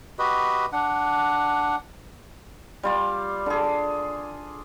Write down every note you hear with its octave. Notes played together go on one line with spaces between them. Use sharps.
F#4 G4 B4 D#5
D4 F#5
G3 F4 D5
D3 G#4